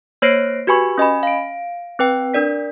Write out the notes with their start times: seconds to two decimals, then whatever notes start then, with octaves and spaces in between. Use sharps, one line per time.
0.22 A#3 C5 C#5 A#6 C7 D7
0.67 F#4 G4 B4 G#5 B5 C#6
0.98 C#4 D#5 G#5 B5
1.23 F5 D7
1.99 C4 B4 G5
2.34 D4 A#4 D5 B6